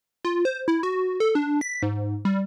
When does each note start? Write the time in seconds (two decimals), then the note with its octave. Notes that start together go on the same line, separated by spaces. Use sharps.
0.25 F4
0.45 C5
0.68 E4
0.83 F#4
1.20 A4
1.35 D4
1.61 B6
1.83 G#2
2.25 G3